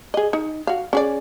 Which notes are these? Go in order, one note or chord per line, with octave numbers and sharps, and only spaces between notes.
G#4 D#5
D#4
F#4 F5
C#4 G#4 D5